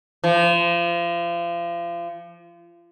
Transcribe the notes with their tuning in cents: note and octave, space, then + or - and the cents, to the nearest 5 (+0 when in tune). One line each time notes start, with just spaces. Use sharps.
F3 -30